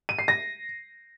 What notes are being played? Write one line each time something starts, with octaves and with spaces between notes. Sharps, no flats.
D#7
C7
A#6